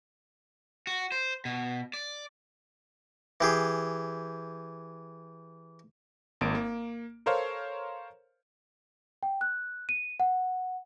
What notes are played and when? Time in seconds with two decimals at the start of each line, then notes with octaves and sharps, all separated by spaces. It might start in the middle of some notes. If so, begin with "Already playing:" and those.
0.87 F#4
1.12 C5
1.45 B2
1.94 D5
3.41 E3 G4 G#4
6.41 G#1 A#3 D7
6.55 A#3
7.26 A4 A#4 C5 C#5 F5
9.23 G5
9.41 F#6
9.89 D#7
10.20 F#5